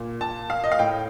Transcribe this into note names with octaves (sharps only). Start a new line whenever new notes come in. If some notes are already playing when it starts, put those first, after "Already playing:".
Already playing: A#2
A5
F5
D#5
F5
A2 G5